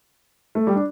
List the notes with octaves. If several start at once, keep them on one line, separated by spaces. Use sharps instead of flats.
A3
G3
D4